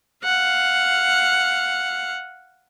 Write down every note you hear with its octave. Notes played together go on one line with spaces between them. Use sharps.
F5 F#5